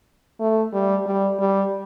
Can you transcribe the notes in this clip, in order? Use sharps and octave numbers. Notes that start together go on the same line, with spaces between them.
A3
G3
G3
G3